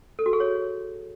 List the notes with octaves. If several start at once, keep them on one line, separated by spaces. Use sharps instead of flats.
A4
F#4
G#4
C#5